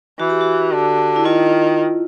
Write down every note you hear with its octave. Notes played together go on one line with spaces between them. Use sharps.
E3 F#4
G4
F#4
D3
E4
D#3 F4